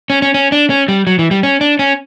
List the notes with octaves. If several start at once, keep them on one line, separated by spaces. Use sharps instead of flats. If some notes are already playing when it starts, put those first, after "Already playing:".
C#4
C#4
C#4
D4
C#4
G3
F#3
E3
G3
C#4
D4
C#4